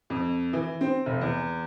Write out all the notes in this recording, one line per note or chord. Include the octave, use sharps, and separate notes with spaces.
F2
E3
C4
F1
E2